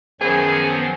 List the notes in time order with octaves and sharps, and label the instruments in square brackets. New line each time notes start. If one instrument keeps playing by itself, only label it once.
[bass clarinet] F#2 [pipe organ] D#3 F3 F#3 [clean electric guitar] B3 C5 G#5 [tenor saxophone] G#4